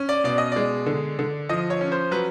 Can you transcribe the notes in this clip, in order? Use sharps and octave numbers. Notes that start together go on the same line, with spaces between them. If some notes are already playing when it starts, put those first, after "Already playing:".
Already playing: C#4
D5
B2 D5
D#5
G#3 D5
D3
D3
F3 D#5
C#5
C#4
C5
F#3 B4